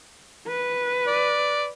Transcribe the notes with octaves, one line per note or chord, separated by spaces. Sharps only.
B4
D5